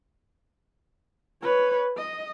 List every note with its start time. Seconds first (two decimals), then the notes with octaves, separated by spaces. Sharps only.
1.43 B4 C#5
1.97 D#5